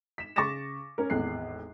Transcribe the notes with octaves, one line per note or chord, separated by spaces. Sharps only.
B6 E7
C#3 C#6 D6 A6 A#6 E7
C#4 A#4
G#1 E2 A2 F#6 C7